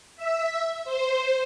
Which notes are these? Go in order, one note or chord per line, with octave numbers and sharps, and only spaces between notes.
E5
C5